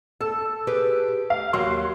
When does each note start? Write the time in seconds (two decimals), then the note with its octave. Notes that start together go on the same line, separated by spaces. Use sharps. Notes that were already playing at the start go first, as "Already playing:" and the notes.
0.21 A4 A5
0.67 G4 G#4 B4
1.30 F5
1.53 D#2 F#3 F#4 C6